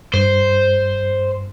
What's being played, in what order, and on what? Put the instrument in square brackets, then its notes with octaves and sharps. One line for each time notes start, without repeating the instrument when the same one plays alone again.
[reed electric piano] G2 [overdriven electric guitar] C5